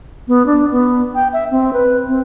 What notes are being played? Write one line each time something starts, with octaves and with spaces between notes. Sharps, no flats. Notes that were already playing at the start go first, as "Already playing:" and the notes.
B3
D4
B3
G5
E5
C4
B4
C4